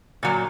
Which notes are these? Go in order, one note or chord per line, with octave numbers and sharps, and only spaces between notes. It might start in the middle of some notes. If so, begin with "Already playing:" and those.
A#2 F#3